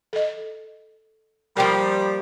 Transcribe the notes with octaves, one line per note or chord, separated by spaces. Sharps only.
A4 D#5
F3 G3 A#3 A#4 G5